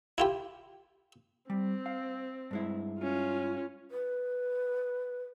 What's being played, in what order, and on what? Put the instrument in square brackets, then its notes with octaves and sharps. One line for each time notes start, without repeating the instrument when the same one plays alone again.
[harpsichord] E4 F4 G4
[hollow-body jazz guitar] G3 [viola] C4
[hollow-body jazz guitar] F5
G2 G#3 E4
[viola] C#4 F4
[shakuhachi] B4